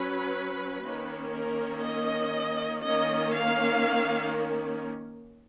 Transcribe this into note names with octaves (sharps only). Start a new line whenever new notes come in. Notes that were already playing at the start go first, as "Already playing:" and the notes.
Already playing: F#3 C#4 B4
D#3 A#3 C#4
A#4
D#5
D#3 A#3 C#4 D#5
F5